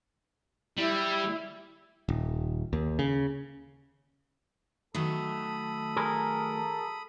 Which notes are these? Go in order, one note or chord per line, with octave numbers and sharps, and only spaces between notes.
G3 E4
D#1
D#2
C#3
D#3 F#3 A3 A4 B5 D#6
G#4 A#4